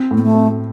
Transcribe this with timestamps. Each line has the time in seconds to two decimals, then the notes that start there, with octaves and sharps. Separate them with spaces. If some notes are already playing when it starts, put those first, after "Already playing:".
Already playing: C4
0.11 A2
0.17 B3
0.23 A3
0.34 C4